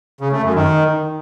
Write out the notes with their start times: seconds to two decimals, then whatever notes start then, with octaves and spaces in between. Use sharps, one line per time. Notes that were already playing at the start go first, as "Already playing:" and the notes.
0.21 C#3
0.32 A3
0.43 F#2
0.55 D#3